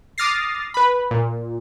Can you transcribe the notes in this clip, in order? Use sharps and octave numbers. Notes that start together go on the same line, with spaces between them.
D6 D#6 F6 A6 A#6 C7
B4 B5
A#2